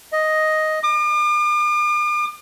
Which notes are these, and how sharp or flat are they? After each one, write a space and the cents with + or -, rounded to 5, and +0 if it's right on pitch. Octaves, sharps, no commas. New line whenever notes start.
D#5 +5
D6 +45